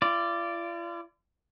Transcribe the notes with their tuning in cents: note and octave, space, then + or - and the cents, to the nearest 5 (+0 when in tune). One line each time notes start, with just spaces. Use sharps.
F4 -40 D5 +0